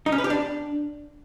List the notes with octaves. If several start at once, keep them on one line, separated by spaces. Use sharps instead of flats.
D#4
C#4
B4
G4
D4